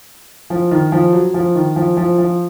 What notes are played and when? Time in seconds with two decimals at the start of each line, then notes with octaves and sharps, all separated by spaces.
0.50 F3
0.71 D#3
0.92 F3
1.13 F#3
1.34 F3
1.55 D#3
1.76 F3
1.97 F3
2.18 F3